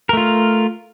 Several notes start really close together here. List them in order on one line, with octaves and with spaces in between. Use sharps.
A#4 A3 F4